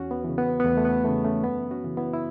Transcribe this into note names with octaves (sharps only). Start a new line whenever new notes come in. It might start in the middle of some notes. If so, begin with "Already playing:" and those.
Already playing: E2 C#4 F#4
B3
C#3 E3
B3
B3
E2 A3
A3
B3
C#3 E3 A3
A3 C#4
F#2 B3
C#4 F#4
C#3 E3
B3 E4
E4